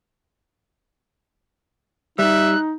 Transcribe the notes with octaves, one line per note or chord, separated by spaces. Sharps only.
G3 D#4 E5 F#6